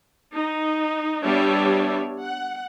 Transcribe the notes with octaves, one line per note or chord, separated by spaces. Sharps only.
D#4
G3 B3 D4 C#5 E5
F#5